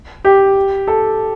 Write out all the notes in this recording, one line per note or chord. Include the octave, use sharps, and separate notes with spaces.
G4
A4